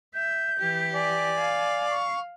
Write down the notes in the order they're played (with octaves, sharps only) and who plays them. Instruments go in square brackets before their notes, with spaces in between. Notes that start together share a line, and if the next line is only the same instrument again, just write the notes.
[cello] E5 [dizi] G6
[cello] E3 G4
[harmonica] D5 [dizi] G#5
[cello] F5
[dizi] C#6